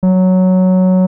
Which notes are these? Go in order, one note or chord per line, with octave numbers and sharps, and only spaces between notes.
F#3